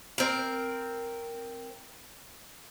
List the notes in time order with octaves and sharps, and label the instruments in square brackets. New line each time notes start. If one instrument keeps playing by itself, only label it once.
[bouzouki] C4 A#4